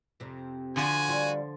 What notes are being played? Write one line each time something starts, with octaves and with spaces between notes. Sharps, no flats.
F2 C3
D3 F3 F#4 G#5
G3 F4